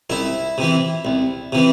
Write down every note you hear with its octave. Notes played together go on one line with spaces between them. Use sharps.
C2 E4
C3 E3
C2
C3 E3